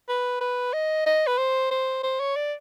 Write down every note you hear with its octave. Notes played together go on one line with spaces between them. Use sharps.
B4
B4
D#5
D#5
B4
C5
C5
C5
C#5
D5